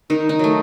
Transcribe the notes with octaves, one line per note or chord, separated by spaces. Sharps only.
D#3 D#4
D#4
F#3 A3